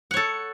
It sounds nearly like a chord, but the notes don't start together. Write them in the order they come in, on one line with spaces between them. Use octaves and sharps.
F#5 C#5 A4